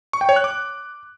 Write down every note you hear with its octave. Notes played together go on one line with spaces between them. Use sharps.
C#6
G5
C#5
F#6
D6